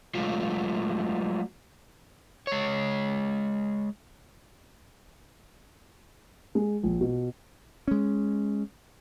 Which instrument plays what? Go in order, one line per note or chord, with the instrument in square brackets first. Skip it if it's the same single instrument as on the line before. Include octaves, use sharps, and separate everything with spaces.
[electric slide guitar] F#3 G#3 A3 F4
G#3 C#5
[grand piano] G#3
A#1
B2
[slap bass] G#3 C#4